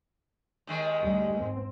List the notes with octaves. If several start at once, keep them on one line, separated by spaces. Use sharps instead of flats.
D#2 D#3 G#3
D2 G3
G#2 C4